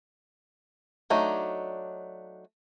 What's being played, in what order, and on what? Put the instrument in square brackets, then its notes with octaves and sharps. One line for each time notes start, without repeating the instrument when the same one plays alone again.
[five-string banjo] F#3 A3 D4 D#4